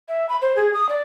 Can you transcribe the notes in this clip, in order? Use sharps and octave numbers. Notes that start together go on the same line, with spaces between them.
E5
B5
C5
G#4
D#6
D5